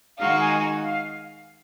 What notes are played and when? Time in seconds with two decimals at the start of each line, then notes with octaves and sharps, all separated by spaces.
0.19 D#3 G#3 D#4 F#4 F5
0.40 G#5
0.82 F5